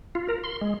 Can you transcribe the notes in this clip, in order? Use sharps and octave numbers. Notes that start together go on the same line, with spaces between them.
F4
A#4
C6
G#3